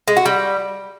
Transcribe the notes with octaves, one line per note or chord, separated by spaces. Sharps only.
G#3
F#4
G3